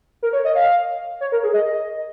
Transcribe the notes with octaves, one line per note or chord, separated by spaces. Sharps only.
A#4
C#5
D#5
F5
C#5
A#4
G#4
D#5